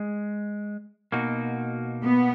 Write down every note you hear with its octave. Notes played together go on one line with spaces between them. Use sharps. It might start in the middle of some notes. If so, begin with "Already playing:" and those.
Already playing: G#3
B2 A#3 D#4 F#4
B3